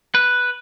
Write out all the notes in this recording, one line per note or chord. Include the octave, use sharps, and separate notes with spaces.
B4